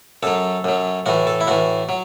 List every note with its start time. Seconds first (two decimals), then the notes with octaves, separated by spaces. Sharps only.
0.23 F#2 F#3 A4
0.64 F#2 F#3
1.06 A2 E3 F#4
1.27 A4
1.41 E4
1.47 A2 E3 F#4
1.89 F#3